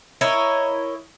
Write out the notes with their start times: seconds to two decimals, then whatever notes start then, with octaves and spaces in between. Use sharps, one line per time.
0.21 E4 A#4 C#5 D#5